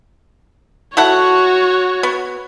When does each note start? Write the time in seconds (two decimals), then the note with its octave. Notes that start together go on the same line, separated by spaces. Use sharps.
0.97 E4 F#4 A4 C#5 F#5
2.03 B3